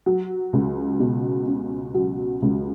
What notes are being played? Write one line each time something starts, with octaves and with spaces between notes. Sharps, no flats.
F#3
C#2
B2
C#4
F#3
C#2